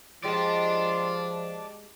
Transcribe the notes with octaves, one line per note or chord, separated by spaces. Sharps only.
F3 G#3 F4 G4 D5 D#5 A5